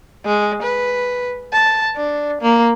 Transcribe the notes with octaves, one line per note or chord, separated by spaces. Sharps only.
G#3
B4
A5
D4
A#3